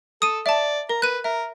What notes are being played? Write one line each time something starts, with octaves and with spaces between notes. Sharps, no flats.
A4 D#6 D#7
D5 E5 A5
A#4 A#5
B4 F#6 D#7
A#4 E5